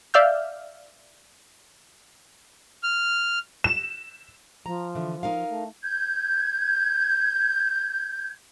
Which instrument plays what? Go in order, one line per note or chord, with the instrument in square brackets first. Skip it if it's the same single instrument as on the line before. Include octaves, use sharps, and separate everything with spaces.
[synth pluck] D5 E5 F5 E6 F6 G6
[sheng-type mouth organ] F6
[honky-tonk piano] E7
[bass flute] F3 [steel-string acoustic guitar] A#5
[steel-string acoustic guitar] D3 E3
D#4 A#4 F5
[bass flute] A3
[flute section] G6 G#6